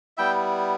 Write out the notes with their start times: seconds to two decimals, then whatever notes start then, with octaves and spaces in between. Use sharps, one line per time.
0.17 G3 B3 E4 E5 G5